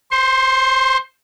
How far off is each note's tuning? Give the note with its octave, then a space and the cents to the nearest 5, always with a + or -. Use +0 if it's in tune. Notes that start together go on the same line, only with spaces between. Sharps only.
C5 +0 C6 +35